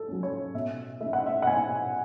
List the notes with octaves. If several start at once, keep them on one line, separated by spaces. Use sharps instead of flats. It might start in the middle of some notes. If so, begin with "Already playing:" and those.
Already playing: A4
F#3 C#4
C#5
B2 E5
A3 C#4 E5
F#5
E5
F#5
B2 G#5